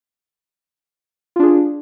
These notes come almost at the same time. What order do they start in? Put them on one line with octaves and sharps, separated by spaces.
F4 D4 G#4